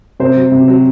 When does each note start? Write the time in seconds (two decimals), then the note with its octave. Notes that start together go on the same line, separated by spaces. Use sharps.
0.20 C3 C5
0.36 F#3
0.52 C3
0.68 F#3